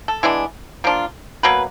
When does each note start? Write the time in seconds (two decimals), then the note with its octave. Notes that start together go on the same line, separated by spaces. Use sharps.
0.08 A4
0.23 E3 G#3 B3 D4
0.84 F3 A#3 D4 F4
1.43 B2 F#3 A#3 B4